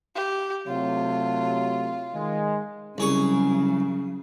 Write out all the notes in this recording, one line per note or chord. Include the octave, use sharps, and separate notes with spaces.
G4
C3 F#3 A3 F4
D#3 G#3
C2 C#3 F#3 G#4 C#6